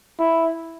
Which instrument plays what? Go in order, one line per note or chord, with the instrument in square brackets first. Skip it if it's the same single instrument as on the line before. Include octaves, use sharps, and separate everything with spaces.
[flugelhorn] E4